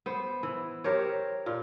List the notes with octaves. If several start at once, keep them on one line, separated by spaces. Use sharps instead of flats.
B3 C5
E3
G4 A#4 C5 C#5
A#2 F4